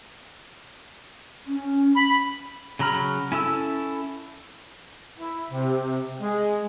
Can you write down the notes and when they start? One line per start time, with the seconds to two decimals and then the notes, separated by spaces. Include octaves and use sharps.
1.47 C#4
1.95 B5
2.79 C#3 F#3 A#5 B5 F6
3.32 C#4 E4 A4 E6
5.18 E4
5.51 C3
6.21 G#3